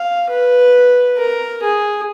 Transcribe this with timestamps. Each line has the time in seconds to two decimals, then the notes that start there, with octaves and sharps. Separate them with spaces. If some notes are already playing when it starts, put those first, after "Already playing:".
Already playing: F5
0.30 B4
1.18 A#4
1.63 G#4